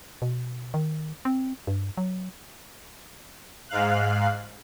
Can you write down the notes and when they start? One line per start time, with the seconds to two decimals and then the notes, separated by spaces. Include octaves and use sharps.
0.22 B2
0.74 D#3
1.25 C4
1.67 G2
1.97 F#3
3.69 G#2 F5 F#6